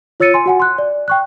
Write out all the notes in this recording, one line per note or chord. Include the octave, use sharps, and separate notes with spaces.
F4 C#5 E6 A6 C#7 D#7
G#5 C6
F#4 F#5 G#5
C6 F#6
D5
G5 C#6 F#6